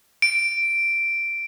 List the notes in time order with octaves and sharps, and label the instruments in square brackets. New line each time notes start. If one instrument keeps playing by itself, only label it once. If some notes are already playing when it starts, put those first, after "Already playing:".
[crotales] D7